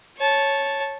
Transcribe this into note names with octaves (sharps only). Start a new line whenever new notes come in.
C#5 A5